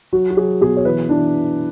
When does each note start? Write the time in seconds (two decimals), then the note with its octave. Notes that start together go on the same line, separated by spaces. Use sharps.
0.13 F#3 F#4
0.30 F#4
0.36 F#3 G#4
0.61 B2 G#4
0.77 C#5
0.85 E3 B4
1.09 E3 D4